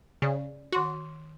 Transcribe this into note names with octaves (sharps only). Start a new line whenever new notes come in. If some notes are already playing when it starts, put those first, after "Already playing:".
C#3 D5
D#3 F#4 C6 C#6